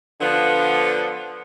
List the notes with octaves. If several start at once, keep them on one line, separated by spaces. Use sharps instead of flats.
D3 F3 B3